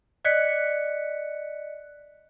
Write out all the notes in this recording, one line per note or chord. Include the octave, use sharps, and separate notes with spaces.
D5 D#5 F#6 B6 C#7